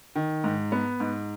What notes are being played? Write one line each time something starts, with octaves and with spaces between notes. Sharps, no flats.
D#3
G#2
B3
G#2